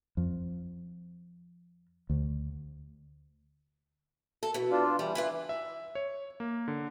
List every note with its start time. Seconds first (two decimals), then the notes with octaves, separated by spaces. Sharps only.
0.17 F2
2.10 D2
4.43 A4
4.54 B2 E3
4.71 D4 F4
4.99 E3 G3
5.15 E4 F4 B4
5.49 E5
5.95 C#5
6.40 A#3
6.68 D3